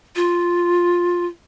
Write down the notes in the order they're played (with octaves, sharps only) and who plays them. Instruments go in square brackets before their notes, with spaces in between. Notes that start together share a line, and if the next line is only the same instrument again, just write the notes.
[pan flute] F4